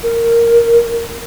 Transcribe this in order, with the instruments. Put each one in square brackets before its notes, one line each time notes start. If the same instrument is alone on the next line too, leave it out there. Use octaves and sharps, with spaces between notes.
[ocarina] A#4